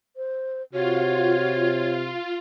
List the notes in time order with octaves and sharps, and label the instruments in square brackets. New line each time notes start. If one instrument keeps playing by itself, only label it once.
[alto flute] C5
[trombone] C3 [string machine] F4 [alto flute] F#4 [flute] C#5